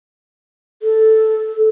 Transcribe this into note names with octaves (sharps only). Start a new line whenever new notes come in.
A4